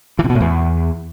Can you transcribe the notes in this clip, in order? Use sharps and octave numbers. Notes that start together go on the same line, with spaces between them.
E3
C3
B2
A2
E2